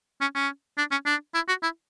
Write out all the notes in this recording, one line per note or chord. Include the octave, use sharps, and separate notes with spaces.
C#4
C#4
D4
C#4
D4
E4
F#4
E4